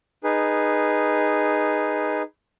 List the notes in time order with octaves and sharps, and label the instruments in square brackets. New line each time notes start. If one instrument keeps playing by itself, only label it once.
[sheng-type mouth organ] D#4 G#4 B4